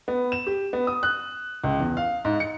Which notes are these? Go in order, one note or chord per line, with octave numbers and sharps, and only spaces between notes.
B3
E7
G4
B3
D#6
F#6
C#2
E2
F5
G#2
C#7